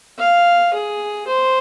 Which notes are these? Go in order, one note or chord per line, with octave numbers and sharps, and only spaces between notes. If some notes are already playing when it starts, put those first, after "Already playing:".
F5
G#4
C5